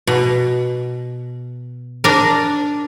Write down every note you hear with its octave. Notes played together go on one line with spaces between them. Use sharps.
B2
D4 A#4